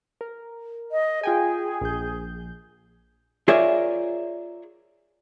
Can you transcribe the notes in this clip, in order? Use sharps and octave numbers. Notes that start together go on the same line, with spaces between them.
A#4
D#5
F4 G#4 G5 G#5
A#1 G6
F4 G#4 A#4 C#5 D5 E5